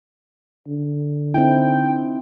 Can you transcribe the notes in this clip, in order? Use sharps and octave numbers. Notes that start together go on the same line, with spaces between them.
D3
C4 D#4 E4 G5